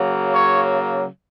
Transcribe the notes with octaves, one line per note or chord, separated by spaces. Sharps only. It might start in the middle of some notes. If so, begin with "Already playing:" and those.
Already playing: C#3 F#3 A#3
C#5